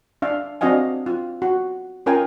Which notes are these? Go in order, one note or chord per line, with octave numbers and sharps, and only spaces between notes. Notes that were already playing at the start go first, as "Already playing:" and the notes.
D4 E5 F5
C4 D4 F#4 D#5 F5 G#5
F4
F#4
C#4 F4 A#4 F5 G5 G#5